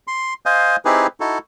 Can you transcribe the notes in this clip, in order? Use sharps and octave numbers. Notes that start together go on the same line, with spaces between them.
C6
C5 D#5 F5 G#5
C4 D#4 E4 G4 G#4 B4
D#4 E4 F#4 A4